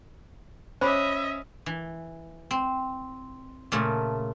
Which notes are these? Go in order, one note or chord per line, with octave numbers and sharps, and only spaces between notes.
C#4 C5 D#5 E5 B5 D6
E3
C4
A#2 C#3 A3